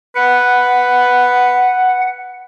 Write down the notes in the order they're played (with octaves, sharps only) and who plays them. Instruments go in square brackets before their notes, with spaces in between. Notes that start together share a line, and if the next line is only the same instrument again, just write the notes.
[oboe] B4 [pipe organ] F#5